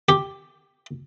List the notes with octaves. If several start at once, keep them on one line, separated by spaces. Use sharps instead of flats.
G4